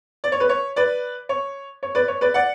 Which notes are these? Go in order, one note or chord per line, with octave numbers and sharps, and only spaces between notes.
D5
C#5
B4
C#5
B4 D5
C#5
C#5
B4 D5
C#5
B4 D5
D5 F#5